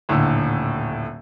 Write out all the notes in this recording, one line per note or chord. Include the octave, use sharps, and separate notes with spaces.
D#1 A2 D3